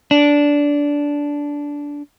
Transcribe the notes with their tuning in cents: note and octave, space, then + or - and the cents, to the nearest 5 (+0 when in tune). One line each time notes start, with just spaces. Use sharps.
D4 -15